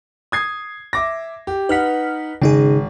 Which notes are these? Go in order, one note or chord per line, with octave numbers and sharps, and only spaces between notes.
D#6 G#6 C7
E5 D6 A#6
G4
D#4 B4 F#5 F6 B6
G#1 C#3 D#4 G#4